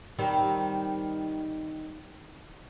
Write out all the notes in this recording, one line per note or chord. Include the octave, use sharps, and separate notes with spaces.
D#3 G3 C4